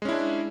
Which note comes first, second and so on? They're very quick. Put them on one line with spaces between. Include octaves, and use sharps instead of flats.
G#3 C#4 E4 D4